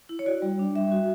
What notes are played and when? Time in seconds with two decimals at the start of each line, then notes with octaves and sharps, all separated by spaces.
0.09 E4
0.19 C#5
0.26 F#4 D5
0.42 G3
0.59 D4
0.75 G3 E5
0.92 F#4